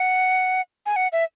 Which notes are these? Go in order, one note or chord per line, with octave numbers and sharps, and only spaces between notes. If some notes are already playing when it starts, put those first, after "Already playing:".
Already playing: F#5
G#5
F#5
E5